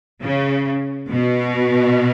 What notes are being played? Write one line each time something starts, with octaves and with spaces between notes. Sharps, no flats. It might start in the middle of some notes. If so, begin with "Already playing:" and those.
C#3
B2